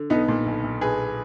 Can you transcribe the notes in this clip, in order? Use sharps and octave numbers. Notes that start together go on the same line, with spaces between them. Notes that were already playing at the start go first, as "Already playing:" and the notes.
Already playing: D3
B1 B3 D#4
A#2
B1
B1
B1 G#4 B4